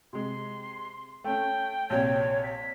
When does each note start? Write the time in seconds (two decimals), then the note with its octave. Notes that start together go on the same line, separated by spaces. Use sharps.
0.13 C3 G#3 C6
1.24 A3 C#4 G5
1.90 A#1 C3 C#5
2.44 B6